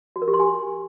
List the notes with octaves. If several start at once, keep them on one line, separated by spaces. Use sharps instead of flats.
F#4
A#4
G4
C6
G#5